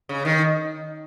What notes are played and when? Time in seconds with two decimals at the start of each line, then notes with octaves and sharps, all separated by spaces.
0.09 C#3
0.25 D#3